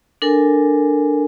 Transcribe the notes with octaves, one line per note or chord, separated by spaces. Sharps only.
D4 A4 A#4 G#5